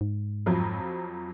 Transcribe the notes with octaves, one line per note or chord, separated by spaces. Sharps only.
G#2
F2 F3 F#3